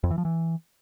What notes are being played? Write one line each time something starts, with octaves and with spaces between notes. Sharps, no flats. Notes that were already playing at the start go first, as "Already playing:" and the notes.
F2
E3
F3
E3